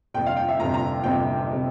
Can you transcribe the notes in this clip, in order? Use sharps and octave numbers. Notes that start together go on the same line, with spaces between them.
G1 F2 C3 G5
F5
G5
E5
G1 F2 C3 A#5
A#5
G1 F2 C3 G5
C3